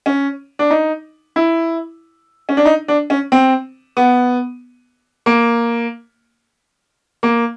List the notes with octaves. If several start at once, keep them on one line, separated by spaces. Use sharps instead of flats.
C#4
D4
D#4
E4
C#4
D4
D#4
D4
C#4
C4
B3
A#3
A#3